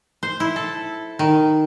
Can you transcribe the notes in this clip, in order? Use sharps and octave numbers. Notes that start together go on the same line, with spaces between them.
C5
E4
A4
D#3